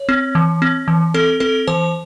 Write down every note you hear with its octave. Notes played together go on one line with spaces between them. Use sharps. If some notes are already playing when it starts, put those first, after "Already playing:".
Already playing: C#5
C4
E3
C4
E3
C4 A4
C4 A4
E3 C5